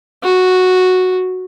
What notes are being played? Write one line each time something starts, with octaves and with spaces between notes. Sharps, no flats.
F#4